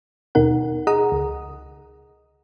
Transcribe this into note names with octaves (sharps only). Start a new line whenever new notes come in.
D#2 B2 D#4 A#4 F#5
G#4 D#5 F#5 A#5 D#6
C#2